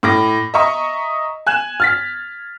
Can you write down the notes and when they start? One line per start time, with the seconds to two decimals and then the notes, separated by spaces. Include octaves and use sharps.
0.03 A2 D6 A#6
0.54 D#5 E5 A#5 C#6 D#6
1.47 G#5 F#6 G#6 E7
1.80 F6 A6 B6